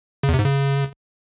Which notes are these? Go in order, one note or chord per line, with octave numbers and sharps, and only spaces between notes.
C#3
E2
C3
G#2
C#3